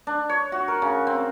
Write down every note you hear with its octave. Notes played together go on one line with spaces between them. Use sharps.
D4
C#5
F#4
A#4
C#3
C4